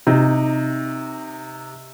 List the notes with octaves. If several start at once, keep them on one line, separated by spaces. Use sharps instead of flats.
C3 D#4